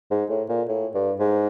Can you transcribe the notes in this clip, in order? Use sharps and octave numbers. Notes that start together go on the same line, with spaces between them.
G#2
A2
A#2
A2
G2
G#2